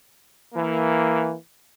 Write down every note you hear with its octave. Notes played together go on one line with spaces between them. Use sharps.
E3 A#3